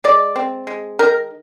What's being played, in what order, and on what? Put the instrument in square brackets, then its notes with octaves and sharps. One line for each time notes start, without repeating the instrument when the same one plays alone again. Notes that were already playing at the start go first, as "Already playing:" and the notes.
[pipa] G#3 D5
C4
G#3
D#3 A#4